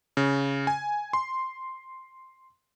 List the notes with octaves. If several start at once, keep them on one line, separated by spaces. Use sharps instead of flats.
C#3
G#5
C6